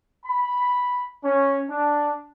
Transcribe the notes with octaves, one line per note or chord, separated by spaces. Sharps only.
B5
C#4
D4